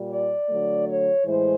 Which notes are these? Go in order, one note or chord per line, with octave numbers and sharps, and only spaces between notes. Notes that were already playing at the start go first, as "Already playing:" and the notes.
Already playing: A#2 G3
D5
D3 F#3 A3
C#5
A2 E3 G#3 C5